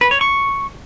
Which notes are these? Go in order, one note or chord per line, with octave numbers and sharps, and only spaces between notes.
B4
C#5
C#6